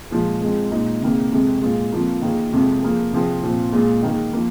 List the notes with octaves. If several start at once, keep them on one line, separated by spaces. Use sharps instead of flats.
A#2 F3 G#3
F3 G#3 C4
A#2 G#3 D#4
C3 D#3 A#3 G#4
F2 C3 G#3
A#2 G#3 F4 G#4
F2 F3 A#3 F4
D#3 A#3 F4 G#4
F2 C3 G#3 F4
F3 A#3 G#4
C3 F3 C4 G#4
A#2 F3 C4
A#2 G#3 F4 G#4
D#3 A#3 D#4 G#4
F3 A#3